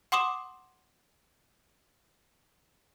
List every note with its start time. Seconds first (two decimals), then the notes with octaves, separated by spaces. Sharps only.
0.12 F#5 C6 D6 D#6 E7